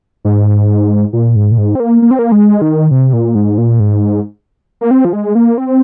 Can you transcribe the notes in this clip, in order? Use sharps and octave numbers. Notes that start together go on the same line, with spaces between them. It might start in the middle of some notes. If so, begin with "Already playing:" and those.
G#2
A#2
G#2
A#2
G#2
C4
A#3
A#3
C4
A#3
G#3
D#3
C3
A#2
G#2
A#2
G#2
A#3
C4
F3
G#3
A#3
C4